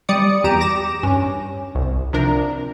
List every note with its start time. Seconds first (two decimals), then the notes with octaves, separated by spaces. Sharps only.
0.09 G3 D5 D6 D#6 C#7
0.44 E2 G4 A#5 D7 E7
0.60 D6 A#6 E7
1.03 G2 C#4
1.75 C2
2.13 C3 F3 D4 A#4